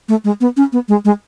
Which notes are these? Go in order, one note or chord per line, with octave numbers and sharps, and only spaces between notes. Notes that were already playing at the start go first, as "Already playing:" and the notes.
A3
G#3
B3
C#4
B3
G#3
G#3